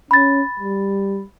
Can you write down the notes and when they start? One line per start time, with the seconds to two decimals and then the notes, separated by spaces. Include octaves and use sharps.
0.11 C#4 B5 A6
0.59 G3